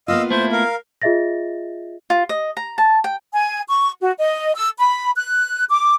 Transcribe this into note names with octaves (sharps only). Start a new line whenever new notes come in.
A#3 B3 F4 D#5 F5 E6
A3 E4 C5
A#4 F5
F4 G#4 D#5 E5 A6 A#6
F4
D#5
A#5
A5
G5
G#5
C#6
F#4
D#5
E6
B5
F#6
D6